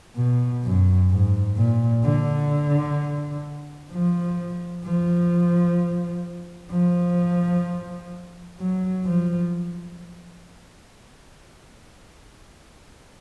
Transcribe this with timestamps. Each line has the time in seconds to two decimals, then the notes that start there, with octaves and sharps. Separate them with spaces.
0.17 B2
0.64 F#2
1.10 G#2
1.57 A#2
2.05 D3
3.92 F3
4.85 F3
6.71 F3
8.59 F#3
9.05 F3